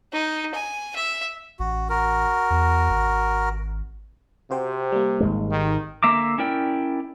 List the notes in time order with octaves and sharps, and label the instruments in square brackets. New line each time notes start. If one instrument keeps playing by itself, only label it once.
[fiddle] D#4
G#5
E5
[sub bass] A1 [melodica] F#4
[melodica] F#4 A#4
[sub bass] E2
G#1
[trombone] C3 [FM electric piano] F#4 C5 G5
[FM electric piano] G3 A#3
[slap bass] G#1 G#2 G#3
[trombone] D#3
[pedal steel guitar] D3 A#3 E5 A#5 D6
C#4 E4 A#4 D5 G5